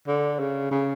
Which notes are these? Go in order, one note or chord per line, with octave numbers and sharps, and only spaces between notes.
D3
C#3
C#3